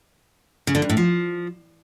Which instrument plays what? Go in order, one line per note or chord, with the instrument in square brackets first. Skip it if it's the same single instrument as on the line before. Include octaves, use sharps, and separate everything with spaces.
[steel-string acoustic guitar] C#3
D3
G2
A2
F3